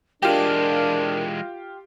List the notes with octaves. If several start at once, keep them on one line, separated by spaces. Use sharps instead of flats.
E3 G#3 D4 F4 G4 A#4